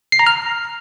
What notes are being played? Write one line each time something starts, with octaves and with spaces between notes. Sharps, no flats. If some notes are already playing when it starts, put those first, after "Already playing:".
C7
A#5
F6